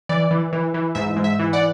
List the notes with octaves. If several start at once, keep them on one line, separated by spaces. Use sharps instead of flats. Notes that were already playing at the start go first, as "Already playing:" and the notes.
E3 D5
E3
E3
E3
G#2 E5
G#2
E5
E3
D5 F#5